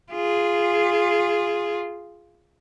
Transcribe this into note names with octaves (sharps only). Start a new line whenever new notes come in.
F4 G#4